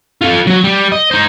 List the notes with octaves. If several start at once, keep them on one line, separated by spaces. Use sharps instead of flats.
F4 A4
F#3 F#4
G3
D#5
D#4 C5